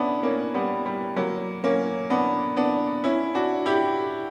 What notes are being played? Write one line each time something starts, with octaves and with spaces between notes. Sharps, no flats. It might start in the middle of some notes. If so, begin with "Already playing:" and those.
Already playing: B3 C#4 D4 E4
A#3 C#4
G3 B3
G3
F#3 A#3
A#3 C#4
B3 D4
B3 D4
C#4 E4
D4 F#4
E4 G4